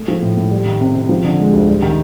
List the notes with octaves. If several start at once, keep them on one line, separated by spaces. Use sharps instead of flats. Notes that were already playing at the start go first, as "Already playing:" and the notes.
Already playing: A3
F3
A2
A2
G3
D#3
C3
C3
F3
D3
G#3
D2
G3
D#3